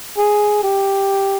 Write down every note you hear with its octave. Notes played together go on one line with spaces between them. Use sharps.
G#4
G4